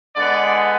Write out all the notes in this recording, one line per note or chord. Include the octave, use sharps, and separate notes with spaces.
D3 G#3 B3 D5